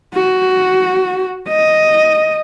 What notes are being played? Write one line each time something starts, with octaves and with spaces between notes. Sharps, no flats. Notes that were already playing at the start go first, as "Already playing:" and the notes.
F#4
D#5